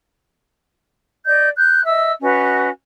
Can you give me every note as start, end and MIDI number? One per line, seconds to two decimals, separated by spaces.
1.26 1.49 74
1.26 1.49 75
1.26 1.49 91
1.57 1.83 90
1.57 1.83 91
1.86 2.11 75
1.86 2.11 76
1.86 2.11 88
2.22 2.69 61
2.22 2.69 66
2.22 2.69 71
2.22 2.69 75